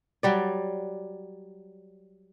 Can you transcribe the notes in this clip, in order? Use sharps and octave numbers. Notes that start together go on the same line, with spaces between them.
F#3 G3 D5